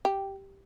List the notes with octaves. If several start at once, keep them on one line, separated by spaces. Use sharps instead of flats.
G4